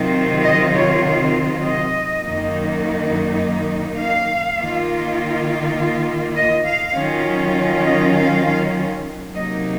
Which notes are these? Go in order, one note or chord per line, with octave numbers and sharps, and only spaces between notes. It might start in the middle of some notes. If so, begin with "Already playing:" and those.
Already playing: C3 D#3 F#3 C4 F4
D#5
C#5
D#5
F#2 D#3 A#3 D#4
F5
D#3 A#3 F4
D#5
F5
D#3 F#3 C#4 F4
D#5
F5
C3 F#3 A#3 D#4 D#5